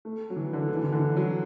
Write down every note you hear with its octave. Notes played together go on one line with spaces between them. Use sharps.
A3
F#3
E3
D3
E3
D3
E3
D3
E3
F#3